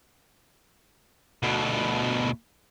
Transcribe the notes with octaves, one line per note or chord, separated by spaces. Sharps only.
D2 B2